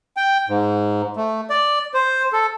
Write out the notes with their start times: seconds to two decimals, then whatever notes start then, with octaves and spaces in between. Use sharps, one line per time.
0.17 G5
0.48 G#2
1.16 A3
1.50 D5
1.94 C5
2.33 A4